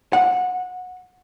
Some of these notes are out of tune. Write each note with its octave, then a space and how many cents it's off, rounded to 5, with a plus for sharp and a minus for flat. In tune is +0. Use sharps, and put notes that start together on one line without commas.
F#5 -20